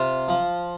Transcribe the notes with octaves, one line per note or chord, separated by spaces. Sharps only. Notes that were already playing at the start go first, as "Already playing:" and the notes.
Already playing: C3 F4
F3